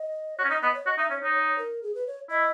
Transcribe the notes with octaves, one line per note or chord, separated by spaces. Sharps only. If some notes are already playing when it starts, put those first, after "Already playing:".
Already playing: D#5
F#4 C#5
C#4
D#4 D#5
B3 D#5
C#5
F#4 D#5
D#4 E5
C#4 C#5
D#4 C#5
C#5
A#4
G#4
B4
C#5
E4 D#5